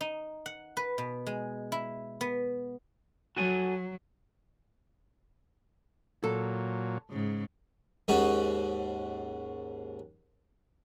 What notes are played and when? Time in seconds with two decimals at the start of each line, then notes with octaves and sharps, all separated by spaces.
0.01 D#4
0.46 F#5
0.77 B4
0.98 B2
1.26 G#3
1.72 E4
2.21 B3
3.37 F#3 F#4 A4 G#5
6.24 A#2 F#3 A4
7.10 G#2 C#3
8.08 D#2 G#2 C#4 D#4 F#4